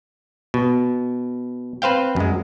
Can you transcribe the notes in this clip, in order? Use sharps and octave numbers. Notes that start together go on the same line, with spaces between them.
B2
C4 B4 C5 F5 G5
F#2 G#3